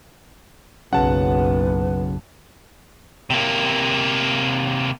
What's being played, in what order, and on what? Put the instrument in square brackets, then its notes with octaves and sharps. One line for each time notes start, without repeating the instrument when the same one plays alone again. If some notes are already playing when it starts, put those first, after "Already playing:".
[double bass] F#1 B1 [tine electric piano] C#3 F#3 [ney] B4 [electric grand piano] F#5 A5
[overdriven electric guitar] C3 A#3